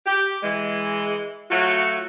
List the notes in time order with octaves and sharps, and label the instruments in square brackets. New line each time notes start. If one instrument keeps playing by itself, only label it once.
[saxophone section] G4
E3 G#3
F#3 A3 F4 F#4